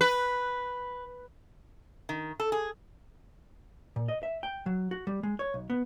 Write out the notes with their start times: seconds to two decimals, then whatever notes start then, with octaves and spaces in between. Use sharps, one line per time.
0.01 B4
2.09 D#3
2.40 A4
2.52 G#4
3.96 A#2
4.08 D#5
4.23 E5
4.43 G5
4.66 F#3
4.91 F#4
5.07 G3
5.23 G#3
5.39 C#5
5.54 B1
5.70 B3